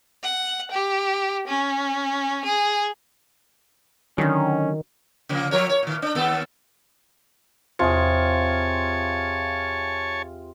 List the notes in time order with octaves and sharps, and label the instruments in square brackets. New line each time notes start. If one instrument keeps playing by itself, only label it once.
[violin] F#5
G4
C#4
G#4
[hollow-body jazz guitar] D3 F#3 [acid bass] D#3 [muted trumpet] C#4
[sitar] C#3 F3 A#3
F3 A#4 C#5
C#5
A#2 D#3
D4
D#2 B3 A4
[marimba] E2 C5 [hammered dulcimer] C3 G#4 [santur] F4 [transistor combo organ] C#5 G#5 A5